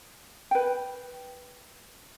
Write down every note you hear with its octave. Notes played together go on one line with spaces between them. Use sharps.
B4 G5